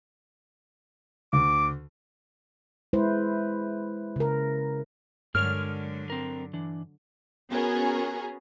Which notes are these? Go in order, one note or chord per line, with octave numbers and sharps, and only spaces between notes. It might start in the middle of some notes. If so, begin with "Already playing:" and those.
D2 D6
G#3 E4 B4 C5
C#3 A#4
G2 D3 F#3 G#3 A#4 C#5 F6
C4 A#4
E3 D4
B3 C#4 F#4 G#4 A#4